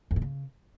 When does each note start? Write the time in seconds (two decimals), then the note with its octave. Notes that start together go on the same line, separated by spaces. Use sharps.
0.11 F2
0.16 A2
0.22 C#3